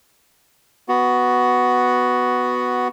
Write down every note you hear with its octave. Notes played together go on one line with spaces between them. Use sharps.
B3 F#4